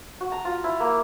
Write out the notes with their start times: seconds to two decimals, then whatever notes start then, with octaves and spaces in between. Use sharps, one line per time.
0.21 F#4
0.32 A#5
0.45 F4
0.64 E4
0.80 A#3